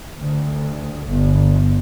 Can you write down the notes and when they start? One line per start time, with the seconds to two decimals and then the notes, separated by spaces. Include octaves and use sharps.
0.18 D2
1.07 G1